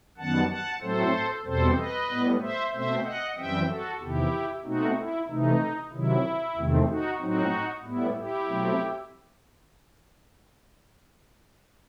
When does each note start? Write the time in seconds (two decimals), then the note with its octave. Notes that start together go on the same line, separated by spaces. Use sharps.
0.18 F#2 D#3 G3 B3 F#5 A5
0.49 F#5 A5
0.81 A2 F#3 A3 C4 A4 C5
1.45 E2 B2 G3 C4 A4 C5
1.77 B4 D#5
2.09 A2 G3 B3
2.41 C5 E5
2.73 B2 A3 C4 C5 E5
3.05 D#5 F#5
3.37 F#2 E3 G3 C4 E5 G5
3.68 F#4 A4
4.01 E2 C3 D#3 E4 G4
4.64 B2 A3 C4 D#4 F#4
4.96 E4
5.28 C3 E3 A3 D#4
5.92 C3 D#3 F#3 E4
6.56 E2 C3 D#3 A3 C4
6.88 D#4 F#4
7.20 A2 F#3 C4 D#4 F#4
7.84 A2 G3 B3 E4
8.16 E4 G4
8.48 B2 F#3 A3 C4